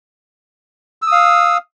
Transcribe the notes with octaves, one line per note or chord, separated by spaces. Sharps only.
F5 D#6 E6